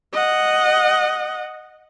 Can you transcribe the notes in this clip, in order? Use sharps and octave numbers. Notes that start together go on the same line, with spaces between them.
D#5 F#5